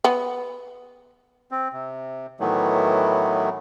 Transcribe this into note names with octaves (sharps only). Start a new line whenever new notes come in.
B3
C4
C3
A2 D#3 E3 F#3 A3 B3